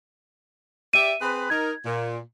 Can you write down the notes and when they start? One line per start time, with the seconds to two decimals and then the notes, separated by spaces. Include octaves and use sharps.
0.94 G4 D5 E5 D#7
1.21 C4 G#4 B4
1.50 D#4 A#4 G#6
1.85 A#2